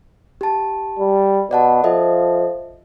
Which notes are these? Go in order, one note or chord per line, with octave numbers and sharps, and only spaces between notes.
G4 A5
G3
B2 D5 F#5 A5
F3 A4 D#5 E5